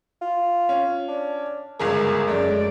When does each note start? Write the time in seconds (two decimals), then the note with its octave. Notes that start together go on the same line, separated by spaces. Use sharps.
0.21 F4
0.69 C#4
1.08 D4
1.80 G1 C#2 G#4 A#4
2.28 F#2 G#3 A3 D5